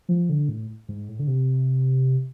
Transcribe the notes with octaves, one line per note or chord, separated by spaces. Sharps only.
F3
D3
A2
G#2
A2
D3
C3